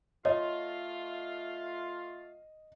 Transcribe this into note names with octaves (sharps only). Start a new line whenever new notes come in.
A3 F4 C#5 D#5 F5